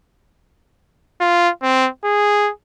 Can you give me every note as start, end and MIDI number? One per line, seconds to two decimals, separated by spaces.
1.21 1.49 65
1.62 1.88 60
2.04 2.51 68